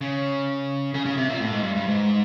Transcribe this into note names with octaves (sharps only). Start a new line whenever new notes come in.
C#3
C#3
C#3
C3
A#2
A2
G#2
G2
G2
G#2